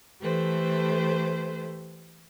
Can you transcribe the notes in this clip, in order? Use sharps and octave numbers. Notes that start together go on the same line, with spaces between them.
E3 A3 G4 A4 B4 C5